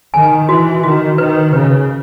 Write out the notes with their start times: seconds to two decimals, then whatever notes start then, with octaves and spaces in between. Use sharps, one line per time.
0.14 D#3 G#5
0.49 E3 F#4
0.83 D#3 F#4
1.18 D#3 B4
1.53 C#3 B4